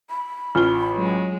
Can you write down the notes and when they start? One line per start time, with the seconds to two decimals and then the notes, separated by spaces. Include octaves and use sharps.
0.10 B5
0.55 A1 F4 G7
0.92 F#3 G#3